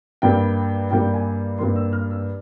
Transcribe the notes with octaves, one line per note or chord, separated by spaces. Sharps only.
G2 G3 A#3 G5
G2 G3 A#3 G5
G#5
G2 G3 A#3 C6
E6
F6
E6